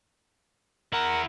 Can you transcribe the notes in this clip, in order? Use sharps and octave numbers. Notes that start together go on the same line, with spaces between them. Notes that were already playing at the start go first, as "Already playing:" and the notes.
E4 A#4 F#5